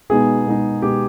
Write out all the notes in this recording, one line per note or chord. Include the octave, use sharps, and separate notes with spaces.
B2 G#3 B3 D#4 G#4
B2 G#3 B3 D#4
B2 G#3 B3 D#4 G4